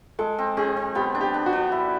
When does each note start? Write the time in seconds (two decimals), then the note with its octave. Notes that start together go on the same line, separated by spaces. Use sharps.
0.19 G#3 A4
0.39 C4
0.57 C4 G#4
0.77 C4
0.95 B3 G4
1.15 D4
1.21 G4
1.34 D4
1.46 F#4
1.53 D4
1.72 E4